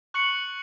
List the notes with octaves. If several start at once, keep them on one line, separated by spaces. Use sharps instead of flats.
C#6 F#6 C#7 F#7